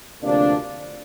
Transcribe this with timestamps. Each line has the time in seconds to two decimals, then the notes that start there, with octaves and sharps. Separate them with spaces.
0.22 D2 C3 F3 A#3 D4